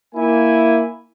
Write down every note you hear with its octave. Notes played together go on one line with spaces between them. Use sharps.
A#3 E4 G#5